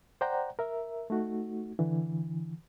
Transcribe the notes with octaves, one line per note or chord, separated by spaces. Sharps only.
C5 D5 F#5 G5 A#5
A#4 E5
A3 D#4 F#4
D3 E3